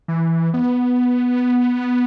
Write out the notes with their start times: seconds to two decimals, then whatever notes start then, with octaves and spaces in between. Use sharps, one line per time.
0.08 E3
0.54 B3